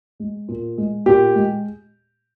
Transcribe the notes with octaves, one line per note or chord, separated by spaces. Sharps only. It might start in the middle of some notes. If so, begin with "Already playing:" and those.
G#3
A#2
G#3
A#2 G4
G#3